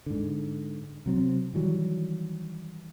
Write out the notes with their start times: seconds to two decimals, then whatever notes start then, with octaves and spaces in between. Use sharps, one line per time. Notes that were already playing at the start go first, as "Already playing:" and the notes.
0.06 G#2 D3
1.06 C3 F#3 C4
1.54 D#3 E3 F#3 G3